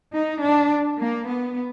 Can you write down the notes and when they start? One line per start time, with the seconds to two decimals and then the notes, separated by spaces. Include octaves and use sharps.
0.13 D#4
0.41 D4
0.98 A#3
1.26 B3